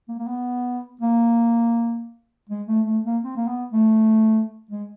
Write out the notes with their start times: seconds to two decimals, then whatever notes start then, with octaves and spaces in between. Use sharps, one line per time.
0.09 A#3
0.19 A#3
0.27 B3
1.01 A#3
2.50 G#3
2.68 A3
2.86 A3
3.05 A#3
3.23 C4
3.37 A#3
3.48 B3
3.72 A3
4.71 G#3